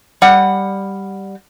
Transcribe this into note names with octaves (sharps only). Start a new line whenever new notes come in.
G3 F#5